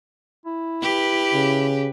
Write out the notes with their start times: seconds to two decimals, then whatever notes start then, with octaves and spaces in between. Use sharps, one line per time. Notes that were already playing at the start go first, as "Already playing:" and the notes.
0.46 E4
0.82 G4 B4
1.34 C#3